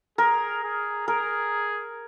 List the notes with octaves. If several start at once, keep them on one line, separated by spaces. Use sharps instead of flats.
G#4 A#4
G#4
G#4 A#4